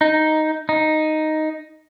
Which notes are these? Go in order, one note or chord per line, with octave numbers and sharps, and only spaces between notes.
D#4
D#4